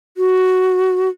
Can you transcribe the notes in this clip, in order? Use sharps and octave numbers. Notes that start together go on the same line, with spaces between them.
F#4